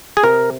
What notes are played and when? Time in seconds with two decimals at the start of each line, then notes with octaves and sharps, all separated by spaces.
0.17 G#4
0.23 C3 A#4